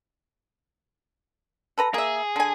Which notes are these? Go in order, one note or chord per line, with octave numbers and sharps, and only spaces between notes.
A4 B4 A#5
A#3 G#4 E5
D3 G#5